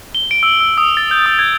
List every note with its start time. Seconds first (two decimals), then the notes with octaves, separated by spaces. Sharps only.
0.15 G7
0.31 D7
0.43 E6
0.60 E6
0.78 D#6
0.97 A6
1.11 G6
1.26 D#6
1.39 G#6